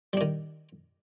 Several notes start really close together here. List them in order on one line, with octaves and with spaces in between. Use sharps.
G3 D4 D#3